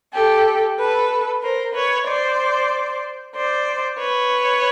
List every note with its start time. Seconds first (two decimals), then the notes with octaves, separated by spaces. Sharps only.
0.14 G4 A4
0.78 A4 B4
1.43 A#4 C5
1.74 B4 C#5
2.07 C5 D5
3.35 C5 D5
3.99 B4 C#5